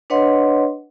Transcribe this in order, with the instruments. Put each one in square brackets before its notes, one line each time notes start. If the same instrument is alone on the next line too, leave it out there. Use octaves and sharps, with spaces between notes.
[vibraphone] D4 B4 C#5 D#5 F#5 C6